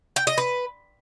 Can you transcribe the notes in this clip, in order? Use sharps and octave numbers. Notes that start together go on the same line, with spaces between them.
G5
D#5
B4